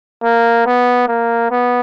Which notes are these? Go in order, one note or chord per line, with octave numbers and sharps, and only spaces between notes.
A#3
B3
A#3
B3